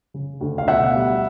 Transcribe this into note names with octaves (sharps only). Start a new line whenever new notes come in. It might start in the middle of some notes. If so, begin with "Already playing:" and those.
C#3
D2
F5
B2 E5 F#5
G3